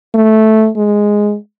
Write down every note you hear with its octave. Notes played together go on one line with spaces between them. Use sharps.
A3
G#3